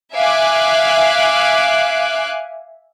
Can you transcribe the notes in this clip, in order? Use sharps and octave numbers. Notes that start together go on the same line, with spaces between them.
E5 F5 G#5 D6 F#6